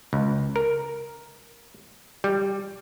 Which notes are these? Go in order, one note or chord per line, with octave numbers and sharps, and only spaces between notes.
C#2
A#4
G3